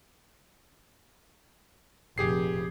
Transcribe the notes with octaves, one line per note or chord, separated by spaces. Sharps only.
F1 A#2 G4 G#4 C7